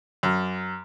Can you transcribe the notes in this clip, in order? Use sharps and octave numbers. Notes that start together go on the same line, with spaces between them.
F#2